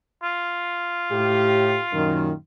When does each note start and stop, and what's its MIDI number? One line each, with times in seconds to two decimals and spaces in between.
0.24 2.36 65
1.12 1.78 45
1.12 1.78 67
1.93 2.31 42
1.93 2.31 46
1.93 2.31 51